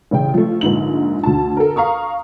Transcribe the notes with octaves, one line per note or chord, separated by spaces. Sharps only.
A1 C#3 G5
F3 A3
A#1 G#2 D3 D#4 F#7
D2 A5
A4 A#4
F5 A#5 C#6 D#6